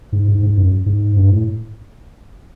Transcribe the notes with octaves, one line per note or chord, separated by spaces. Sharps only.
G#2
G#2
G#2
F#2
G#2
G2
A2